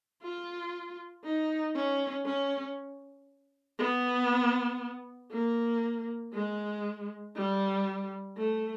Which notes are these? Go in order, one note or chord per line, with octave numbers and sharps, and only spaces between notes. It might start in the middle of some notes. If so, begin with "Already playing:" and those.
F4
D#4
C#4
C#4
B3
A#3
G#3
G3
A3